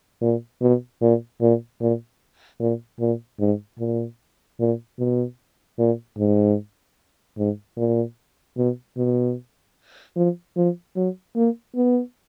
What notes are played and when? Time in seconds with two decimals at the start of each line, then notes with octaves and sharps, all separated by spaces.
0.22 A#2
0.61 B2
1.01 A#2
1.41 A#2
1.81 A#2
2.60 A#2
3.00 A#2
3.40 G#2
3.79 A#2
4.60 A#2
4.99 B2
5.79 A#2
6.18 G#2
7.38 G#2
7.77 A#2
8.57 B2
8.97 B2
10.16 F3
10.57 F3
10.96 F#3
11.36 A#3
11.76 B3